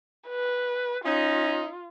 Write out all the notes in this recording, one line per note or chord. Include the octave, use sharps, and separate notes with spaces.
B4
C#4 D#4 F4